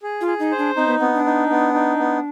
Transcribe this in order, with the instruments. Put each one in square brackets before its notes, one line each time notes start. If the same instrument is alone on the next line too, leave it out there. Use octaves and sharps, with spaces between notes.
[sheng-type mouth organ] G#4
[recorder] F4
[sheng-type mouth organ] G#4
[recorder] D#4
[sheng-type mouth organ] C5
[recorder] D4
[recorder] C4 [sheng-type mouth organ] D#4
[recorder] B3
[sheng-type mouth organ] B3 [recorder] C4
[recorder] D4
[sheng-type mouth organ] D#4
B3
D#4
B3